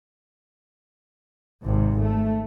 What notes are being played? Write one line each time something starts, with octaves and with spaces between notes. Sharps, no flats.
G#1 C3
A3